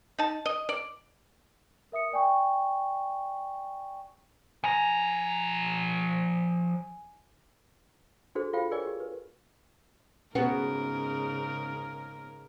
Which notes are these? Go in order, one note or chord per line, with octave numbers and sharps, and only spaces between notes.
D#4 A5
D#5
D5
A#4 E5 D#6 C#7
D5 G5 G#5 C#6
F3 G#5 A#5
D4 F#4 G#4 A4 C5
F4 A4 C5 F5 G5
G#4 A#4 C#5 D5 G#5
G4
B4
G#2 C#3 B3 C#4 F#4 G#4 A#4